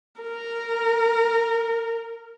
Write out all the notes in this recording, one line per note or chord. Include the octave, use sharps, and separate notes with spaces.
A#4